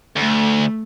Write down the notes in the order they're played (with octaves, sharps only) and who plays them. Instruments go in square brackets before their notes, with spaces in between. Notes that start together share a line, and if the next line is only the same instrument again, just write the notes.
[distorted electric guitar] D2 [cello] A3